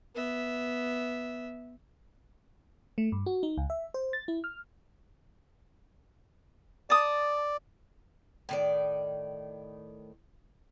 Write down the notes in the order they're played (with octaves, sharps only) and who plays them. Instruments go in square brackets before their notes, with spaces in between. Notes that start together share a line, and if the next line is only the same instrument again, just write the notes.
[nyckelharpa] B3 E5
[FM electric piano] A3
G2
F#4
D#4
C#2
E5
C5
A6
E4
F6
[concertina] D5 [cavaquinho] A5 D#6
[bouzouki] A2 D#3 D5